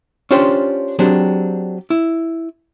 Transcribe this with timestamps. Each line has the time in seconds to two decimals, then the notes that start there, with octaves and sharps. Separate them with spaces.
0.31 C#4 D4 F4 G4 C5
0.99 F#3 C4 D4 G4 G#4
1.90 E4